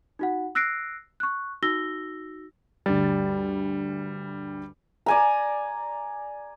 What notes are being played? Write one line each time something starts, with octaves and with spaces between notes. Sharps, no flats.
D#4 F#4 F#5
E6 F#6 A#6 C7 D7
C#6 F#6
D#4 F#4 E6 A#6 G7
D2 G2 G3 A6
D5 G#5 A#5